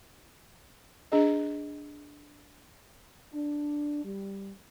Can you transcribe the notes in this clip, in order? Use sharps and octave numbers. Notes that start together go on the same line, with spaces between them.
D4 G#4 D#5
D4
G3